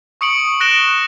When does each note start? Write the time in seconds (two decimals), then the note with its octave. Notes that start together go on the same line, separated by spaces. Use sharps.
0.21 C#6 D#6 C#7 D7 F#7
0.60 F#6 A#6 D7 E7 G7